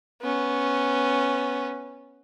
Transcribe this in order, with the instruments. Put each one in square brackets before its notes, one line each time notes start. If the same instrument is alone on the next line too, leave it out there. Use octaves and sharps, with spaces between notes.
[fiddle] B3 C#4